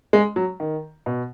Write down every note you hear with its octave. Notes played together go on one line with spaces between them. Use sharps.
G#3
F#3
D#3
B2